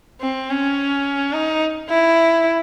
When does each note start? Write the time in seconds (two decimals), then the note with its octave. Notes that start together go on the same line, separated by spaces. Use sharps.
0.21 C4
0.50 C#4
1.33 D#4
1.89 E4